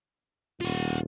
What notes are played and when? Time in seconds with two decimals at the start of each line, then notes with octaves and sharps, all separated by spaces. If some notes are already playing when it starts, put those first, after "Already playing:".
0.61 D#1 F4 F#5